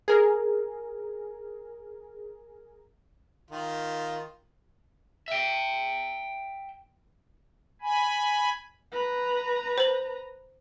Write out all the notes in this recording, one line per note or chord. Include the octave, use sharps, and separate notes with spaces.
G#4 A#4
D#3 F4
E5 G5
G#5 B5
B4 A#5
C5 F#7